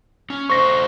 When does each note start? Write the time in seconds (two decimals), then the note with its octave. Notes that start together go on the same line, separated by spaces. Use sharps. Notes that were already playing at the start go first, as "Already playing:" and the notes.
0.30 C#4
0.50 A3 C5 C#6 A#6